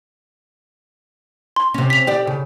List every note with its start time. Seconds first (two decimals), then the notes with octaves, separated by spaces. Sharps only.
1.56 C6
1.74 C3 C#4
1.90 B6 F7
2.07 G4 D5
2.27 C#3